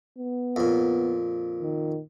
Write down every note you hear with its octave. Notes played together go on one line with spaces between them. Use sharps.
B3
F2 A#2
D#3